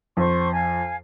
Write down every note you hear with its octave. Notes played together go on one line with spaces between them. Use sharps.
F2 C5 C#6
F5 G#5